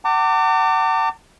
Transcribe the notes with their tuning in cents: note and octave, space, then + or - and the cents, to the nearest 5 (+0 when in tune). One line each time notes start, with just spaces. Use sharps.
F#5 +35 A5 +45 D6 +0